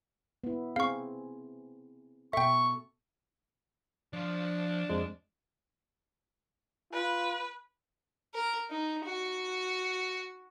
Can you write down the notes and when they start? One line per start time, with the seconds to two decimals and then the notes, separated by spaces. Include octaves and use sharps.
0.44 B3 E4
0.76 C4 G#4 F5 C#6
2.33 B2 A4 E5 G5 C#6
4.13 F3 D4 C6
4.89 F2 F3 G#3
6.93 F4 B4
8.34 A#4
8.71 D#4
9.05 F#4